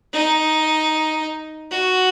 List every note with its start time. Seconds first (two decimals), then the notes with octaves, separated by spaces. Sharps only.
0.13 D#4
1.70 F#4